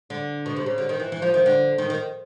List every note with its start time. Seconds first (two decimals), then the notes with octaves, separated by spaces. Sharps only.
0.10 D3
0.46 B2
0.56 C3
0.66 C#3
0.78 D3
0.89 D#3
1.00 E3
1.12 E3
1.22 F3
1.34 D#3
1.46 D3
1.78 D#3
1.90 D#3